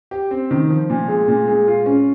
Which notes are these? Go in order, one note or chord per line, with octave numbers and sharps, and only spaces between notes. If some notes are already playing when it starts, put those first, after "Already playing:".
G4
C4
D#3
F3
A#2
G#3
A#2
G#3
F4
C#4